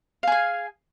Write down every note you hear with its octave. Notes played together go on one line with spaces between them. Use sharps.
G#4 F5 G#5